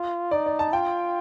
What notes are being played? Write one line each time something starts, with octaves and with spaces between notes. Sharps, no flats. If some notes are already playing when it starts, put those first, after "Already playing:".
Already playing: F4
D#4 D5
D5
A5
F4 G5